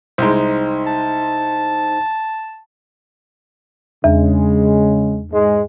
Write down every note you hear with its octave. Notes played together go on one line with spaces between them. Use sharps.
C2 G#3 D#4 C5
A5
E2 C#3 G#3
G#2 G#3